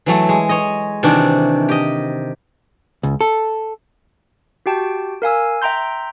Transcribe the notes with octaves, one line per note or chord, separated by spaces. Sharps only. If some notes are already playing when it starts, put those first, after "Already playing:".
E3 F#3 A3
G#3
C#5 D#5
C3 D#3 E3 D4 F#4
G4 D#5
C#2
A4
F#4 G4 G5 A5
A#4 F5 G#5 E6
E5 G5 A#5 C6 G6